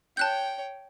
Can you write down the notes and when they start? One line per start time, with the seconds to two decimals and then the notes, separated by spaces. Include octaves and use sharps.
0.17 C#5 G5 A5 F#6 G6